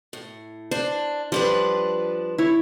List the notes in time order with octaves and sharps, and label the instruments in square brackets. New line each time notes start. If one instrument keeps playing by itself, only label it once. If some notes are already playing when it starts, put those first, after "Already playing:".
[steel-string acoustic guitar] A2
[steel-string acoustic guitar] D4 [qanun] C5
[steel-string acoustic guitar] F3 D4 B4 [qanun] G3
[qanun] E4 C#5